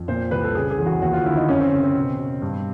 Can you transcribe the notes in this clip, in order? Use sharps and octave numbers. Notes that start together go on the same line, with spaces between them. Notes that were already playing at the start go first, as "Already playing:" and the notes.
Already playing: F2
A#2 C5
C2 B4
A4
C#3 G#4
G#4
E2
F#4
D#2 F#4
F4
D3 E4
D#4
F#2 C#4
C4
C#3
C4
B2
B2
G2